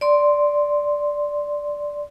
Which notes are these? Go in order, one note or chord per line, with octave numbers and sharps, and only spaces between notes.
D5 C6